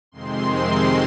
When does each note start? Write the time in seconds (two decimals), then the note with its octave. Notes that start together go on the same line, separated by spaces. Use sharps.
0.12 F2 C3 D#3 G#3 C4 C6